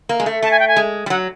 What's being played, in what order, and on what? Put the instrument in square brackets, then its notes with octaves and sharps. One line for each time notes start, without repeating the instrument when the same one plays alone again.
[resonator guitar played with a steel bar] A#3
G#3
A3
[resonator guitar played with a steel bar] A3 [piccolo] A5
[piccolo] G#5
G5
G#5
[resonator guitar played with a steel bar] G#3
G3
[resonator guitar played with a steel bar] F#3 [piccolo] F#5